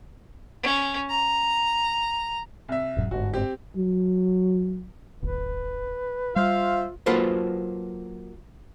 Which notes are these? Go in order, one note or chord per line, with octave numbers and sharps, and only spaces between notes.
C#4
A#5
C2 E5
E1 G#2 F#3
G1 G#2 F#4
C4 G4
F#3
D1 G1 B4
G3 F4 C5 E5 F5
F#3 A#3 F4 A4 B4 C5